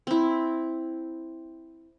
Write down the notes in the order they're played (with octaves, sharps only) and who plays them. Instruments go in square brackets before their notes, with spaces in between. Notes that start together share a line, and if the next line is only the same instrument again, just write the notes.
[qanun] C4 E4